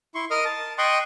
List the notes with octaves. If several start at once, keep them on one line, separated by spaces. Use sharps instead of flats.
E4 C6 C#6
A#4 D#5 D#6 F6
A5
D#5 G5 C6 C#6 D#6 F#6